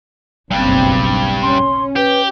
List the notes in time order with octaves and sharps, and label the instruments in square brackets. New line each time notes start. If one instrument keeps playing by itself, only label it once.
[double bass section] F#1 B1 C4 [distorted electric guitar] G2 G3
[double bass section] C#4 [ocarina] C6
[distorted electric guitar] G4 [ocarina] B4